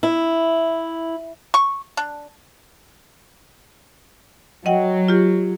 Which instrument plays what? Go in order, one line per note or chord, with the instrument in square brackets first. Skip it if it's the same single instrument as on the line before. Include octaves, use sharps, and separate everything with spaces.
[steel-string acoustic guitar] E4
[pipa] C#6
D4
[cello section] F#3 [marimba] D#5 F#5 G5
[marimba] F4 G4